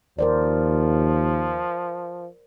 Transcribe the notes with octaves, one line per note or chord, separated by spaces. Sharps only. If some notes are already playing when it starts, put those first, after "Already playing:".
D#2 F3 A#4 C5 D5